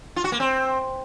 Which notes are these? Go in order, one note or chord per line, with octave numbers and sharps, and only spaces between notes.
F4
F#4
A#3
C4